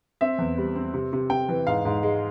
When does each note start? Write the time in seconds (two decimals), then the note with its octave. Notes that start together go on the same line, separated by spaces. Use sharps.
0.21 C4 E5
0.38 E2
0.58 G3
0.76 C4
0.94 C3
1.13 C3
1.30 C3 G5
1.49 E3
1.67 G#2 F5
1.85 G#2
2.03 G#3